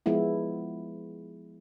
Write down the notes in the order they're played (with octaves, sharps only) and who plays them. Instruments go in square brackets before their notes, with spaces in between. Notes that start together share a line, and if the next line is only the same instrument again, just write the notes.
[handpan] F3 G#3 B3 E4